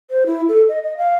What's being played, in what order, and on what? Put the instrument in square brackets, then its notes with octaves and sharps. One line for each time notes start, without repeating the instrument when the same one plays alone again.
[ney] C5
E4
A4
D#5
D#5
F5